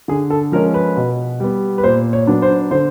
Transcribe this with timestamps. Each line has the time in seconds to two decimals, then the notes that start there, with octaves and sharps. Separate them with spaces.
0.08 D3 G#4
0.30 A4
0.52 F3 G#3 C#4 A#4
0.74 B4
0.97 B2
1.40 G3 B3
1.78 B4
1.84 A#2 C5
2.13 C#5
2.27 F#3 B3 D4
2.42 C5
2.71 D3 C5